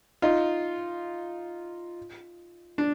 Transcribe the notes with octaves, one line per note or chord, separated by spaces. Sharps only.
D#4 F4
D4